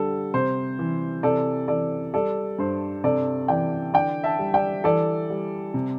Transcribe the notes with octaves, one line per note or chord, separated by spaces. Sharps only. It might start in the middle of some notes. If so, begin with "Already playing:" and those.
Already playing: D3 G3 A4
C3 C5
E3
C3 A4 D5
E3 A4 D5
G3 A4 D5
G2 C5
C3 A4 D5
E3 D5 G5
D3 D5 G5
E5 A5
G3
D5 G5
E3 A4 D5
G3
C3